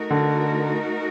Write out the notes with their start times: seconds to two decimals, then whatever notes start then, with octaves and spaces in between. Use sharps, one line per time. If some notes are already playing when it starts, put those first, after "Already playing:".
Already playing: A3 D#4 F#4 A#4
0.10 D3